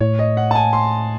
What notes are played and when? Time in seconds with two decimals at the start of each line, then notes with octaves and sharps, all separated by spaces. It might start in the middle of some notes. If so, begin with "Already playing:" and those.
0.01 A2 C#5
0.19 D#5
0.37 F#5
0.51 A5
0.55 G#5
0.73 C6